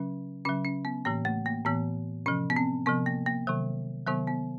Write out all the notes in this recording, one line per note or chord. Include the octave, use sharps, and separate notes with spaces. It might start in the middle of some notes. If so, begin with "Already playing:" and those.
Already playing: C#3 F#3 C#4
C#3 F#3 C#4
C#4
B3
A2 E3 A#3
A3
A#3
A2 E3 B3
C3 F3 C#4
B3
C4
C3 F3 B3
A#3
A#3
C3 D#3 F#3
C3 D#3 F#3 B3
B3